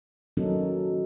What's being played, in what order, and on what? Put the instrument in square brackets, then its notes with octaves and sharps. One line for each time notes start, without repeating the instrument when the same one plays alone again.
[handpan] D#3 F#3 A#3 C#4 D#4 A4